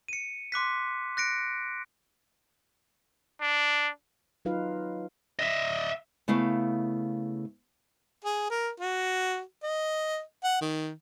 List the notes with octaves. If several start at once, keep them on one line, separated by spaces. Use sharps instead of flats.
C#7 D#7
C6 D6 F#6 B6
F#6 A#6 C#7 D7
D4
F#3 D#4 F4 B4 F5
D#5 E5
C#3 A3 B3 E4 F5
G#4
A#4
F#4
D#5
F#5
D#3